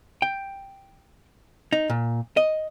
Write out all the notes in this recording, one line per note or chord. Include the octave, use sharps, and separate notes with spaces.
G5
D#4
A#2
D#5